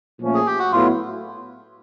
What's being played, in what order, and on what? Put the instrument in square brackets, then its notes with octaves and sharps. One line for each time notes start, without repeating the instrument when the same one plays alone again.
[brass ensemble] A#2 F3 A3 C#4
[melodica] G#4
G4
F#4
[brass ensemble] A2 F#3 B3 E4 [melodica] F4